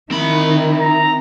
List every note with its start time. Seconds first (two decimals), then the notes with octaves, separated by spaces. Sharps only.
0.11 D#3 C4 D#4 E4 B5
0.80 A#5